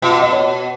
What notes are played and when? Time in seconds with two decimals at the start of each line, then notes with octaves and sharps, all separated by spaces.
0.02 B2 F4
0.21 D#5
0.32 C#5